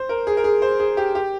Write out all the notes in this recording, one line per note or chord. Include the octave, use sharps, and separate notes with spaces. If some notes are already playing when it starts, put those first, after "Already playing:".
Already playing: C5
A#4
G#4
A#4
G#4
C5
G#4
G4
G4